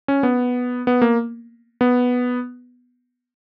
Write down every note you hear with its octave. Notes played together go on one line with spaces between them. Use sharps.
C#4
B3
B3
A#3
B3